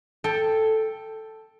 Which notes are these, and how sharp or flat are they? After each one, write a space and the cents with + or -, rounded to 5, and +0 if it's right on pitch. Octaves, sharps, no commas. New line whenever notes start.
A4 +0 G5 +10